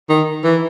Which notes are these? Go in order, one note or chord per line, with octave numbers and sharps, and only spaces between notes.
D#3
E3